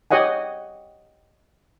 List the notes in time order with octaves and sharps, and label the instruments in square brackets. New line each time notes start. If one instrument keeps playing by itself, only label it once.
[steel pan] G4 C#5 D#5 F#5 G#5